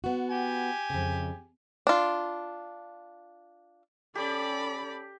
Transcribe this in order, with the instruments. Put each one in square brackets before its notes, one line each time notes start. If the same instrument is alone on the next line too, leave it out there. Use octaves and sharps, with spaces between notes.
[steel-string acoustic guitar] B3 F#4
[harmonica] G4 G#5
[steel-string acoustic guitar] F2 C#3
[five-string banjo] D4 F4
[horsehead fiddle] C#4 A4 [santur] G4 [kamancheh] D5 B5